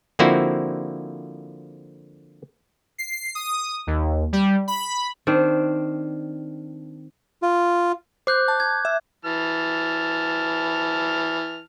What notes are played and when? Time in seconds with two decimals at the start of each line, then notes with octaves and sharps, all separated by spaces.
0.19 D3 F3 A#3 C4 E4 F#4
2.98 C7
3.35 D#6
3.87 D#2
4.33 G3
4.68 B5
5.27 D#3 C4 D4
7.42 F4
8.27 C5 D6 F#6 G6
8.48 A5
8.60 G#6
8.85 E5
9.25 E3 A5 F6